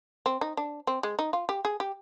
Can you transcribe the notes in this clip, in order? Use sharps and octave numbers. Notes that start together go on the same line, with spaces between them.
C4
D#4
D4
C4
G#3
D#4
F4
G4
G#4
G4